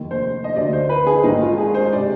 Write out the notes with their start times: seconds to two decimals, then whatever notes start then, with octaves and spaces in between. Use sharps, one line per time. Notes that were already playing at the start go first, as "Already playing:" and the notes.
Already playing: F1 D#2 D#3
0.11 C5
0.44 D#5
0.56 D2 D3 D5
0.73 C5
0.89 B4
1.07 G#4
1.23 G#1 G#2 D#3 D#4
1.42 F4
1.58 G#4
1.74 C5
1.93 C3 D5